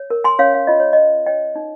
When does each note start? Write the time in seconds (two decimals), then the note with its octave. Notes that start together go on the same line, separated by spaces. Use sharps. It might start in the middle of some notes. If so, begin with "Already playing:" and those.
Already playing: C#5
0.10 A#4
0.24 G#5 C6
0.39 C#4 C#5 F5
0.54 F5
0.67 F4 D#5
0.80 C#5
0.93 C#5 D#5
1.26 C#5 D#5 G5
1.56 D#4